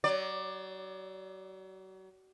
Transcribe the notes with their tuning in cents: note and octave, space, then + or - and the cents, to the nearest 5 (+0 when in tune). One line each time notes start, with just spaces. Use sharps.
F#3 +35 D5 +15